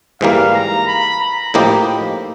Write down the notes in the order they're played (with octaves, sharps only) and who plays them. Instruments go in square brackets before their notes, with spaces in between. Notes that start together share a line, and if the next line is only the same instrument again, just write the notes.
[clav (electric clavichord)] G#2 E3 G3 A#3 [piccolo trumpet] F5
[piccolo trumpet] A#5
B5
A#5
[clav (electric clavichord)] A2 F3 A#3 D#4 G4 [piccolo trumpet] B5